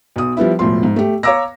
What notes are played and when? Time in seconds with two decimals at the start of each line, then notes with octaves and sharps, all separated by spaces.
0.16 B1 D#6
0.37 F3 G3 B3 E4
0.59 E1 A2 F3 C6
0.83 G#2
0.96 A3 G4
1.23 C#5 F5 A#5 D6 E6 A#6